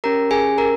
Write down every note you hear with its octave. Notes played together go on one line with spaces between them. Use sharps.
C#4 G4 A#4 A#5
G#4 G#5
A#4 A#5